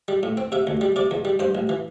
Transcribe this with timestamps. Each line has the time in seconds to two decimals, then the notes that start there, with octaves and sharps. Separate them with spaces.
0.08 G3
0.23 A2
0.37 C4
0.52 C3 E5
0.67 D2
0.81 G3
0.96 C3 D5
1.11 E2
1.25 G3
1.39 G2 C5
1.55 A1
1.69 E3